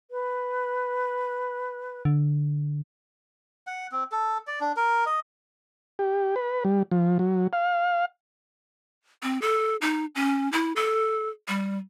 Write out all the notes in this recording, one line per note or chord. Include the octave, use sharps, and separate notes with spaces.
B4
D3
F#5
C4
A4
D5
D4
A#4
D#5
G4
B4
G3
F3
F#3
F5
C4
A4
D#4
C#4
E4
A4
G3